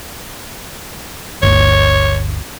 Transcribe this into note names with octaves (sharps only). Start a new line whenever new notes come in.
G1 D2 C#5